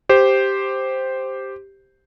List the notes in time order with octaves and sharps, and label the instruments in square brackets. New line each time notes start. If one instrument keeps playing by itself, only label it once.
[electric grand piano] G4 C5